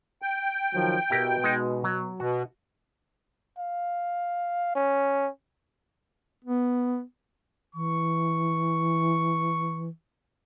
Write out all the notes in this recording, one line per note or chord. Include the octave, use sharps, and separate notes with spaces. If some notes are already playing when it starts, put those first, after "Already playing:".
G5
D#3 F3 F#3
B2 E4 G4 A#4
G#3 D#4
F#3
B2 F#4
F5
C#4
B3
E3 C#6